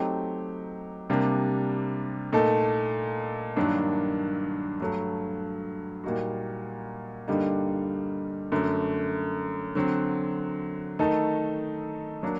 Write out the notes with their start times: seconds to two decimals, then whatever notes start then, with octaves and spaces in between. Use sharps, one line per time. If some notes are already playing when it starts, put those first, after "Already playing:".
Already playing: F#3 A3 C4 D#4 G4
1.10 C3 G3 A#3 D4
2.33 A#2 A3 D#4 A4
3.56 G2 D#3 F#3 A#3 D4
4.81 G2 F#3 A3
6.04 A#2 G3 A#3 D#4 F#4
7.28 G2 D3 G3 A#3 D#4
8.52 F#2 D3 A3
9.75 D3 F#3 C4
10.99 D#3 A3 D#4 A4
12.23 F#3 A#3 D4